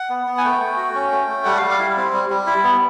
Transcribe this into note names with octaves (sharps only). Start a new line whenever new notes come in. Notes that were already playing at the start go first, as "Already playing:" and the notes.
Already playing: F#5
B3
B3
G#5
A3 G5
A3
F#4
C#4
A3
A3
G3 F#5
F5
G3
F5
E4
C4
G3
G3
E4
B3